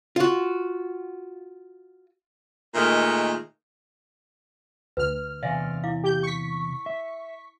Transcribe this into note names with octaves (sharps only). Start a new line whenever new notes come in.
F4 F#4
A#2 D#3 G#3 A3
D2 B4 F6
E2 C3 D5 E5 F5 G#5
E4 F5 D6
G4 G6
C#6 B6
E5